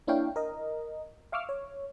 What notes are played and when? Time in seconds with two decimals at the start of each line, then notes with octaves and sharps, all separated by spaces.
0.07 A#3 D4 E4 C#5 F5 G5
0.36 A#4 D#5
1.32 E5 F5 C#6 D6 E6 F6
1.49 C#5